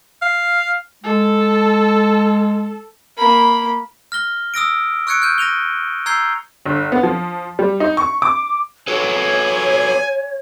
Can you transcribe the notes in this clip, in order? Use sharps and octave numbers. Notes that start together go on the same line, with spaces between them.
F5
G#3 A4
A#3 B5
F6 A#6 G7
D#6 E6 A#6 D7
C#6 E6 F#6 G#6 C#7 D7
F6 G6 D#7
A#6 D#7 F7 G7
A#5 E6 G6 G#6 C7 G7
G1
B3
F3
G3
D#4
C#6
D6
F#4 A4 B4 C#5 G#5